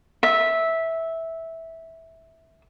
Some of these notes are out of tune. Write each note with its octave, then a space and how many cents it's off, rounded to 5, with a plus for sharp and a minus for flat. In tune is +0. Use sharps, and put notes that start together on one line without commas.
E5 -10